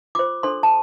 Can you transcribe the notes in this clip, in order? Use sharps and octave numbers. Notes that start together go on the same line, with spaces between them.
F4 C5 D6
D4 A4 C5 C6
A5